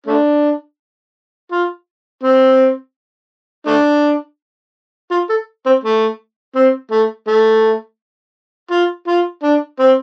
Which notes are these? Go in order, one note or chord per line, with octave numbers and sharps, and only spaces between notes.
A3 D4
F4
C4
A3 D4
F4
A4
C4
A3
C4
A3
A3
F4
F4
D4
C4